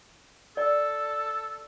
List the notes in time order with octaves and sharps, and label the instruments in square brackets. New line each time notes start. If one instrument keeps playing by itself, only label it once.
[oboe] A4 [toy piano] D5